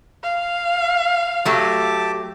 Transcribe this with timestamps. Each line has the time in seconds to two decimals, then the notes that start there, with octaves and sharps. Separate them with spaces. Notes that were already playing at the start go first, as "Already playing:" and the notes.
0.23 F5
1.45 F#3 A3 G4 A5 D6